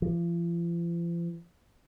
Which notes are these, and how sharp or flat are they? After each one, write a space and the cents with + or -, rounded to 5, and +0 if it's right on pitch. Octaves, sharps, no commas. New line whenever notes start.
F3 -45